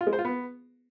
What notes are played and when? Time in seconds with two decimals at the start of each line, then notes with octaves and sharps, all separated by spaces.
0.01 F4
0.07 G#3
0.13 C5
0.19 F4
0.25 B3